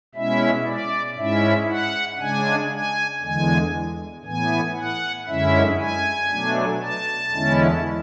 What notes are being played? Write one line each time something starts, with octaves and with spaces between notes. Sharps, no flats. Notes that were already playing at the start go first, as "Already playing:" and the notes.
B2 G#3 C#4 E4 E5
D5
G#2 G#3 C#4 E4 E5
F#5
C#3 G#3 D4 G#5
G#5
E2 D3 G#3 G#5
A2 E3 B3 G#5
F#5
F#2 D3 G#3 C#4 E4 E5
G#5
B2 F#3 A3 D4
A5
E2 D3 G#3 C#4 E4